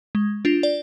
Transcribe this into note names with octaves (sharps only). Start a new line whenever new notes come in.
G#3
D4 F4
D5